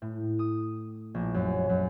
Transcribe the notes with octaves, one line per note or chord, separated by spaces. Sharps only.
A2
D#6
A#1
F#2
F#2